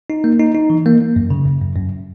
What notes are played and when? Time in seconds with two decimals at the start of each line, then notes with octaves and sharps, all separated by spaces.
0.10 D#4
0.24 A#3
0.40 D#4
0.55 D#4
0.70 E3
0.86 A#3
1.01 A#3
1.16 F#2
1.30 C#3
1.45 F#2
1.62 F#2
1.76 F#2